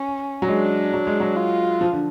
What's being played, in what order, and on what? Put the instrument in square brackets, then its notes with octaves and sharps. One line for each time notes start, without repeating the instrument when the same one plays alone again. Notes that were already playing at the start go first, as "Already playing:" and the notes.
Already playing: [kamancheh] C#4
[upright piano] F#3
[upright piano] G#3 [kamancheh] D4
[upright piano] F#3
G#3
F#3
[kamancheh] F4
[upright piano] F3
D3